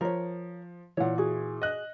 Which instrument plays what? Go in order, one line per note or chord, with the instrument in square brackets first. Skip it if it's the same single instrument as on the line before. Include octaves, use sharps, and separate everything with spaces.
[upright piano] F3 [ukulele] A#4 C#5
[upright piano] A#2 E3 [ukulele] C#5 F#5
[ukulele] F#4 G#4
[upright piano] D#5 F#6